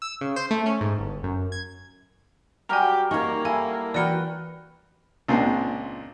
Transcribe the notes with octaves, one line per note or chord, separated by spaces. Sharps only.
E6
C#3
C5
A3
C#4
G#2
G1
F#2
G#6
F#3 G3 G4 A#4 G#5 A#5
A#3 D#4 A#4 C#5 A#5 C#6
E4 A4 F5 G#5
E3 F#4 A#4 B4 D5 G5 A#6 C#7
C#2 A#2 C4 D4